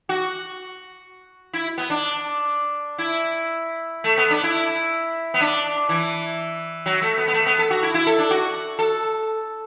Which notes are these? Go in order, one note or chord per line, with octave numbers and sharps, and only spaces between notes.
F#4
E4
B3
D4
E4
A3
B3
D4
E4
B3
D4
E3
F#3
A3
B3
B3
A3
B3
A4
F#4
E4
E4
A4
D4
F#4
A4